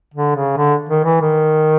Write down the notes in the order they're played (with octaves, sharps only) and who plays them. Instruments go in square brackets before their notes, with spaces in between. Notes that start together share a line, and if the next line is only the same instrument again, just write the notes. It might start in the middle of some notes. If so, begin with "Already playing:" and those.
[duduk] D3
C#3
D3
D#3
E3
D#3